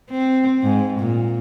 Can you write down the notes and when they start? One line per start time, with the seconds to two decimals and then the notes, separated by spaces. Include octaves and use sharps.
0.10 C4
0.63 G#2
0.99 A#2